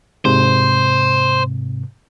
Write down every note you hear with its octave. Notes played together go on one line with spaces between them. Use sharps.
G#2 C3 C5